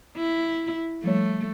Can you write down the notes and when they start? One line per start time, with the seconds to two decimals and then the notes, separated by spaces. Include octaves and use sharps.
0.17 E4
1.04 F3 G3 A3 C#5